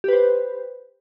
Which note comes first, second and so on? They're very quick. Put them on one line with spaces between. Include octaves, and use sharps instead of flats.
G4 B4 C5